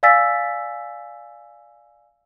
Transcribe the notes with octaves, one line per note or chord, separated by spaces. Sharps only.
D5 F5 G#5 E6 A6 B6